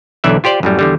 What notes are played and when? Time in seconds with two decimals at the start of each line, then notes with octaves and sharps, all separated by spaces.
0.24 B1 D3 E3 D5 E5
0.44 F4 G4 C5 D5
0.63 F#2 A2 G3
0.79 E2 D3 G3